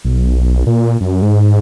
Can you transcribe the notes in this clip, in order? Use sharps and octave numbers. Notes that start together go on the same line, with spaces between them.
B1
A#2
F#2
G#2